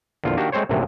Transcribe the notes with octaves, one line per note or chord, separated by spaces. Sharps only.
A#1 E2 D3 F4
D#3 A#3 D4 F#4 G4
G#3 A3 C4 C5 C#5
A#1 F#2 A2 C3 E3